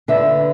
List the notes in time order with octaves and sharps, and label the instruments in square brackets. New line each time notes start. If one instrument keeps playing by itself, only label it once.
[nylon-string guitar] D3 B4 E5